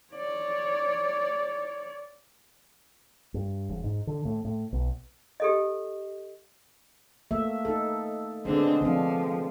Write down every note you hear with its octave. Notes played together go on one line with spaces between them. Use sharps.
C#5 D5
G2
E1
G#2
D3
A2
A2
B1
G4 A4 D#5
A3 A#3 E5
D#4 A4
D3 G#3 B3 C4 D4
D3 F3 C4 D4